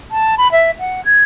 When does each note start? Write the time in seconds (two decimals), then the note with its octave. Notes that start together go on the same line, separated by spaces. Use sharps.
0.11 A5
0.38 B5
0.52 E5
0.80 F#5
1.05 G#6